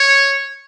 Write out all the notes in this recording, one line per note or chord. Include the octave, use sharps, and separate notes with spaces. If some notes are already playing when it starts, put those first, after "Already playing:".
Already playing: C#5